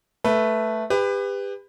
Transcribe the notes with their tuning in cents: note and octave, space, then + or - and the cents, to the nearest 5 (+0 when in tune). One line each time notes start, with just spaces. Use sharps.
A3 +0 B4 -10
G4 +35 B4 +15